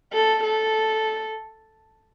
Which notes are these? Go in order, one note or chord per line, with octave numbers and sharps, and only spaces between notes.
A4
A4